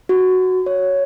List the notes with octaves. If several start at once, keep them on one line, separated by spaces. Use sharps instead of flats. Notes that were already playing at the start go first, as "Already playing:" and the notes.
F#4
C#5